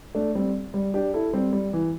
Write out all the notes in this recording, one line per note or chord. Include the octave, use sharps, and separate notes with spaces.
A3 D4
G3 C4
G3
D4 G4
E4 A4
G3 C4
G3
E3